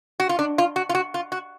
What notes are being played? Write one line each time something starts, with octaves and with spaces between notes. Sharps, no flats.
F#4
F4
D4
F4
F#4
F4
F#4
F4
F#4